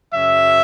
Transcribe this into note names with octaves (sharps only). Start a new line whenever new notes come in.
F#2 C#3 F#3 C#4 E5